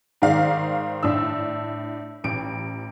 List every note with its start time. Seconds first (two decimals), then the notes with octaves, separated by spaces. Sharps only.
0.22 G#2 D#3 D5 F5
1.03 A2 D4 E6
2.24 A1 D7